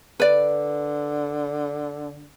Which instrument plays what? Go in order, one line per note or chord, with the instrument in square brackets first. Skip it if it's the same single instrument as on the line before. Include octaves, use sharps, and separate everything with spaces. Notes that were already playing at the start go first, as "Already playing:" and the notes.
[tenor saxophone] D3 [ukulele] B4 D5